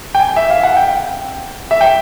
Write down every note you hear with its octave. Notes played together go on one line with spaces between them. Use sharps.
G5
G#5
E5
F5
F#5
G5
E5
G5